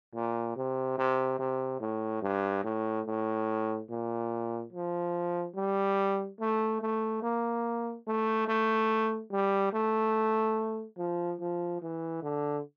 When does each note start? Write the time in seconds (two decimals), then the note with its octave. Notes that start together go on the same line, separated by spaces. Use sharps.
0.14 A#2
0.56 C3
0.98 C3
1.39 C3
1.80 A2
2.22 G2
2.64 A2
3.07 A2
3.90 A#2
4.73 F3
5.55 G3
6.40 A3
6.81 A3
7.23 A#3
8.07 A3
8.48 A3
9.32 G3
9.73 A3
10.97 F3
11.40 F3
11.81 E3
12.23 D3